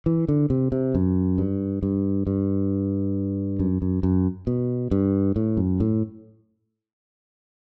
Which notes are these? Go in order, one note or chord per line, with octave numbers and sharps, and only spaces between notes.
E3
D3
C3
C3
F#2
G2
G2
G2
F#2
F#2
F#2
B2
G2
A2
F#2
A2